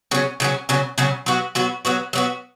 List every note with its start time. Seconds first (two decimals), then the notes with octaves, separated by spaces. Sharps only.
0.11 C#3 F#3 C#4
0.40 C#3 F#3 C#4
0.69 C#3 F#3 C#4
0.98 C#3 F#3 C#4
1.26 F#3 B3 F#4
1.55 F#3 B3 F#4
1.85 F#3 B3 F#4
2.13 F#3 B3 F#4